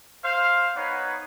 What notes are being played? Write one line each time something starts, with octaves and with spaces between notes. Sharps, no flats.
C5 F5
B3 D#4 B4 C#5